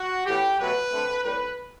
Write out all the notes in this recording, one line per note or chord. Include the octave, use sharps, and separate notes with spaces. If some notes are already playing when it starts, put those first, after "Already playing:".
Already playing: F#4
A2 E3 B3 G4
B2 F#3 A3 B4
D3 A3 C4
A2 G3 C4 B4